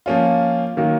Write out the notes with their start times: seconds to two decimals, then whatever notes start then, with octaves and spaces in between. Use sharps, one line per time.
0.06 F3 A#3 C#4 F4
0.77 D#3 F#3 A#3